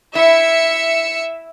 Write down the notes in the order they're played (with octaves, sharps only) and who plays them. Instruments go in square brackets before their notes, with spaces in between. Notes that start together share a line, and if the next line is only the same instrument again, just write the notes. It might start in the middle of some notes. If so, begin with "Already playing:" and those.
[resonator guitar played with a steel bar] E4 [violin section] E5 C#7